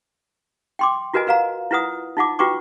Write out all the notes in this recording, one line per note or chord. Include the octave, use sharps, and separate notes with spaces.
G5 C6 D6
F4 F#4 A#4 B4 D#5 G#5
A#4 B4 F5 F#5 A#5
E4 F4 B4 F#5 D#6
D#4 F4 F#5 D6
F4 F#4 B4 G5 C#6 D6